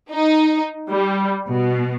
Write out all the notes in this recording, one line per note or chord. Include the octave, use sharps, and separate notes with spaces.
D#4
G3
B2